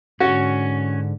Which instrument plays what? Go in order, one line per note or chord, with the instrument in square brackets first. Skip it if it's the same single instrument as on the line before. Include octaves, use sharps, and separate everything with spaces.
[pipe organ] G#2 D3 [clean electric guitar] C#4 [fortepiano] F#4